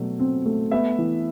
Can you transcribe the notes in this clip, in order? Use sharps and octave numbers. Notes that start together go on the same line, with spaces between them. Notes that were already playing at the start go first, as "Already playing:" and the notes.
Already playing: B2 F#3 A3
C4
A3
B3 E5
E3